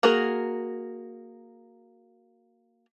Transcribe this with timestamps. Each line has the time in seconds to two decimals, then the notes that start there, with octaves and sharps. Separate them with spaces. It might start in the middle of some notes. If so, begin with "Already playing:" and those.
0.03 A#3 F#4 G#4 A#4